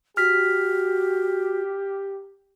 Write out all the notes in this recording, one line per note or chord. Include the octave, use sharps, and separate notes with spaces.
F#4 G4 F6 B6